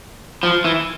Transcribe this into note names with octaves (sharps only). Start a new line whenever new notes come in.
F3
E3